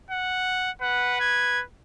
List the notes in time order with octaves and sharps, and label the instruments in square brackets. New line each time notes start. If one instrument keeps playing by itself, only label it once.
[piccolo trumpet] F#5
[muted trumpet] B4 [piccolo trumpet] F#5
[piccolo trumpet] G#6